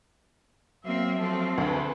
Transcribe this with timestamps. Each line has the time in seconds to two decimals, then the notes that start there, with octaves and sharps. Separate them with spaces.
0.86 F#3 A#3 C4 E5
1.19 F3 A3 C4 A4
1.58 D2 G#4 A4 B4